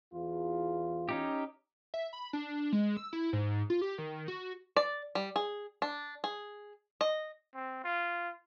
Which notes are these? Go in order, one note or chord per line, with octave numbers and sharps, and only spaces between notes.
E2 F4
C#4 D#4 G4
E5
B5
D4
G#3
E6
E4
G#2
F4
G4
D#3
F#4
D5
G3
G#4
D4
G#4
D#5
C4
F4